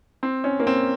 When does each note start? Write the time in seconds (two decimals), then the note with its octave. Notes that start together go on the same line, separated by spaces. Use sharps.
0.23 C4
0.44 C#4
0.60 A#3
0.67 C4